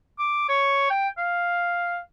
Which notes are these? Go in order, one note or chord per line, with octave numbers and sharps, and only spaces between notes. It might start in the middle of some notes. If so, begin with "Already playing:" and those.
D6
C#5
G5
F5